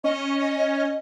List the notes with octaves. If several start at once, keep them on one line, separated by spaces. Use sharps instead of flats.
C#4 D#5